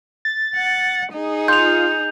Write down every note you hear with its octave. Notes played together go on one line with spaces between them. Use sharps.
A6
F#5
D#4 G#4
F4 G6 F7